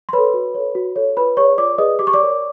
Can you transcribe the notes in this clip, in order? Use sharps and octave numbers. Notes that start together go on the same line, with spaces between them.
C6
A4 B4 C#5 B5
F#4
A4 C#5
F#4
A4 C#5
F4 B4 B5
G#4 B4 C#5 D5 C#6
F4 D5 D6
G#4 B4 D5 D#5 D#6
G4 D6
C#6
D5 D6
A#4 C#5